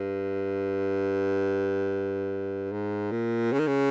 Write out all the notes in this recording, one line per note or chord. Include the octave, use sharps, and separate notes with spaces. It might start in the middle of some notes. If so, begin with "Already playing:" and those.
Already playing: G2
G#2
A#2
C#3
D#3
C#3